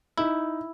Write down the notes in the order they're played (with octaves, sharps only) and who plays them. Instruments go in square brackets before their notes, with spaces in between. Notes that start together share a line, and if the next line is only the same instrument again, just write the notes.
[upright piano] D#4 [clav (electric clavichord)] E4